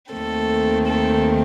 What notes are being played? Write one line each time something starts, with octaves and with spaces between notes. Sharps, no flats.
D#2 D#3 A3 C4 A4
A4